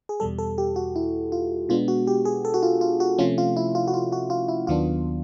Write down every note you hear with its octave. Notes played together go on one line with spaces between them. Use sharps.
G#4
E2 B2 G3 A4
A4
G4
F#4
E4
F4
B2 G#3 B3 D4 F4
F#4
G4
G#4
A4
F#4
F4
F4
F#4
C3 F3 A3 C#4 F4
F4
E4
F4
F#4
F4
F#4
F4
E4
D#2 D#3 F#3 B3 D4 F4